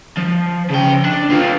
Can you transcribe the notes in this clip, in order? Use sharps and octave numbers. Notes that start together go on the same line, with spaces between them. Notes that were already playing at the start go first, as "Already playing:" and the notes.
F3
C#3 G5
D4
D3 F4